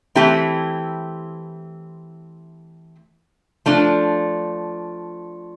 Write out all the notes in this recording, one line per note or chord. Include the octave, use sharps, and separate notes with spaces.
E3 A3 C4 E4 G4
F3 A3 D4